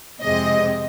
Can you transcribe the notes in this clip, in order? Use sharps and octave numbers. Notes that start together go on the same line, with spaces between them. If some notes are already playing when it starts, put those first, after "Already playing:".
F2 C3 G#3 C4 D#5